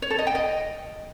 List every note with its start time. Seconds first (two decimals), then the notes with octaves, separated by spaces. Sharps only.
0.02 C#5
0.10 A4
0.19 D#5
0.27 G5
0.35 D#5